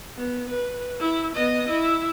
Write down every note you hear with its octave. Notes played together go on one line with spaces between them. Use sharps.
B3
B4
E4
B3 D#5
E4